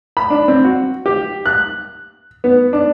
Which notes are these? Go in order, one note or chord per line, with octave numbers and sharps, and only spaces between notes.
B5
D4
C4
F#4
G4
F#6
B3
D4